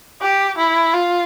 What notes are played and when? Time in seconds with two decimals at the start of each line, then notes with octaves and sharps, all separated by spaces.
0.21 G4
0.58 E4
0.94 F4